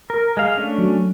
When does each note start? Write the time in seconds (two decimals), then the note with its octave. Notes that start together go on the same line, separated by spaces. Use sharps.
0.10 A#4
0.37 G#3 F5
0.57 A3 C#4 D4
0.78 F#3